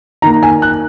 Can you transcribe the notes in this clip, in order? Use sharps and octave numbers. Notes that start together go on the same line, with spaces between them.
D#3 A#3 A#5
G#5
F#6